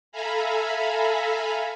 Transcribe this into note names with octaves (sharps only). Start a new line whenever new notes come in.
A4 E5 F5 G#5 A#5 B5